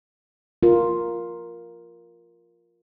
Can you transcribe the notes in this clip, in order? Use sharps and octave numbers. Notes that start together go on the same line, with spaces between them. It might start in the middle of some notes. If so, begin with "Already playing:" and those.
F4 A#4